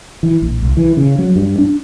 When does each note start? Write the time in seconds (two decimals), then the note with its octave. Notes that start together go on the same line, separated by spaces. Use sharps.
0.23 E3
0.42 A#1
0.62 C2
0.77 E3
0.97 C#3
1.19 F#3
1.36 G2
1.58 D4